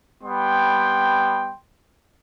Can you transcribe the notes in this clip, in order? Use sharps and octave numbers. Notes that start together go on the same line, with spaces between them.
G3 B3 G5 C6